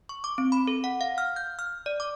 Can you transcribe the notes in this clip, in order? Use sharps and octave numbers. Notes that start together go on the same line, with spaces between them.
C#6
D6
C4
B5
A4
F#5
F5
F6
G6
F6
D5
D6